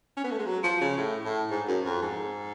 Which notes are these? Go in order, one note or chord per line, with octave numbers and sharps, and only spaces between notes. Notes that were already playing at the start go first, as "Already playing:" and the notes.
C#4
B3
A3
G#3
F#3
F3
C#3
A2
A2
G#2
F#2
F2
G#2